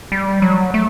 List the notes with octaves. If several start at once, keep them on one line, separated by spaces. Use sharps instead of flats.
G3
F#3
A3